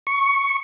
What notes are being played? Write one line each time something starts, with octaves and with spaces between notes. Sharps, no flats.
C#6